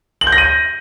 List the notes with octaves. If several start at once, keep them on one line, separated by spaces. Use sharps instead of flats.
F#7
G6
A#6
D#7